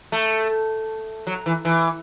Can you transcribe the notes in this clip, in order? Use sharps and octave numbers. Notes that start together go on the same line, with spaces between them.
A3
F#3
E3
E3